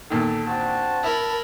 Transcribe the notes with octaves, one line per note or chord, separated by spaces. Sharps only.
E2 A#2 D#3 A4
C4 D4 F#4 A5
E4 A#4 B5